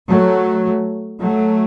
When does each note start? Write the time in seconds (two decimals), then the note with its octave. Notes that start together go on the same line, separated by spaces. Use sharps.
0.09 F#3 A3
1.21 F#3 A3